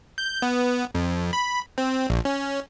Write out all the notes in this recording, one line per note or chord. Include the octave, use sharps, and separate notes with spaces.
G6
B3
F2
B5
C4
A#1
C#4